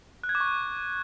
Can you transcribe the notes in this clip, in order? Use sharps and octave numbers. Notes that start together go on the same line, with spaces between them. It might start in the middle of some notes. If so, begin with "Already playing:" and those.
F#6
G#6
D6
C#6